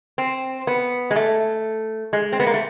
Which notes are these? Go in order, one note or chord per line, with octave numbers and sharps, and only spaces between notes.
C4
B3
G#3
A3
G#3
C4
B3
A#3
A3